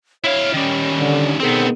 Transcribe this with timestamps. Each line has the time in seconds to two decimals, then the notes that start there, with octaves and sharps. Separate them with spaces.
0.24 E4 C#5 F5
0.54 D#3 G3 C#4
0.98 D3
1.40 B2 D3 D#3 B3 C4 G#4